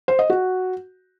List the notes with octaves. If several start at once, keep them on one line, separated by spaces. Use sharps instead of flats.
C5
D#5
F#4